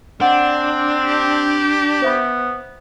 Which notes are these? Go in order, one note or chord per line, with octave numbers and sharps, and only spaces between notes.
C4 D4 D#5 F#5
G4
B3 C5 E5 B5